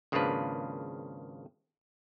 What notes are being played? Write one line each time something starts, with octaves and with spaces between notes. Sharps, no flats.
G#1 C#3 F3 A#3 D4 B4